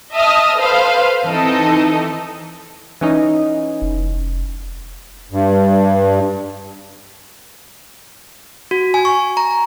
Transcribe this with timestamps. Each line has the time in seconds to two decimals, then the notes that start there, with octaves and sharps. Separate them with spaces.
0.13 D#5 E5 A5 D#6 F6
0.56 A4 B4 C5 F5
1.26 E3 C4 D#4 A4 D#5
3.01 E3 C#4 D#4
3.82 F1
5.32 G2
8.71 F#4
8.94 G#5
9.05 C#6
9.37 A#5